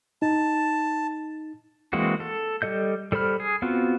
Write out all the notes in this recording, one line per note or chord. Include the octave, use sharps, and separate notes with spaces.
D#4 A5
E3 G#3 A#3 C4 F#4
A4
G3 A4 D#5 G6
G3 A4 C5 B5 F6
G#4
B3 C4 F4 F#4